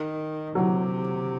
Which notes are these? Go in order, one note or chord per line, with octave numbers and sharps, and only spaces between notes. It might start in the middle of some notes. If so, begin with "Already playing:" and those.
Already playing: D#3
C3 F#3